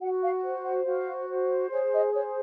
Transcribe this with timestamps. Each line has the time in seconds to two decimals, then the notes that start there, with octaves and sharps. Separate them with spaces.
0.01 F#4 F#5
0.23 F5
0.44 C5
0.65 F#5
0.86 F#4 F5
1.29 C5
1.71 G#4 C#5
1.92 D#5
2.13 C5 C#5